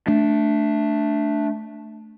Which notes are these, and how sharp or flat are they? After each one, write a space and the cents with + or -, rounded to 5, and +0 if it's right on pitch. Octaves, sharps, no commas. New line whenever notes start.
A3 +0 D4 +0